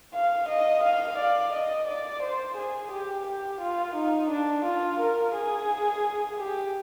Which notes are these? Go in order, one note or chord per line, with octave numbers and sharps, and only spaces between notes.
F5
D#5
F5
D5
D#5
D5
C5
G#4
G4
G4
F4
D#4
D4
F4
A#4
G#4
G4